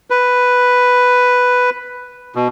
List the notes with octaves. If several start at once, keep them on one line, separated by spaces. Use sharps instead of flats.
B4
B2